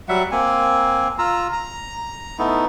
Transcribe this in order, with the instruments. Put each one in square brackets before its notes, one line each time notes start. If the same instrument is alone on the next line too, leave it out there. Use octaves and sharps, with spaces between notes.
[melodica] F#3 G3 E5 F#5
A#3 C4 G#5
F4 A#5 E6
A#5
A3 B3 D#4 E4